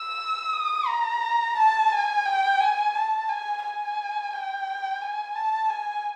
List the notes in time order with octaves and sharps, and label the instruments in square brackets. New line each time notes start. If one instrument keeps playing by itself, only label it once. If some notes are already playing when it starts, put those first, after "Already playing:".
Already playing: [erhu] E6
D#6
A#5
A5
G#5
G5
G#5
A5
G#5
G#5
G5
G#5
A5
G#5